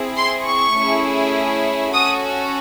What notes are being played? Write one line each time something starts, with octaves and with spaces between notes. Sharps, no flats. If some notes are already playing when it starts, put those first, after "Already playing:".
Already playing: C4 E4 G#4
C6
C#6
A3 C#4 E4 G#4
C#4 F#4 A4 D#6